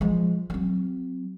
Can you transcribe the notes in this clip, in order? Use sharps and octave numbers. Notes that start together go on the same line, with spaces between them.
F3 G#3
F#3 C4